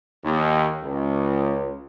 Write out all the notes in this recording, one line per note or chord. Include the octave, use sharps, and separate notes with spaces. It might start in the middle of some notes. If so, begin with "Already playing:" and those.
D#2
C#2